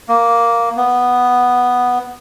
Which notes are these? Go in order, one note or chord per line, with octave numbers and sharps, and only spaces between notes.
A#3
B3